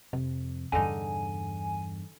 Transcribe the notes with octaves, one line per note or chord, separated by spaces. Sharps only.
F2 C3
E2 G2 D3 D#4 G#5